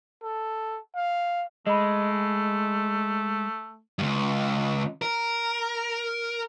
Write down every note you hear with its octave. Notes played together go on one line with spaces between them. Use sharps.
A4
F5
G#3 A3 D#5 B5
C#2 G2
A#4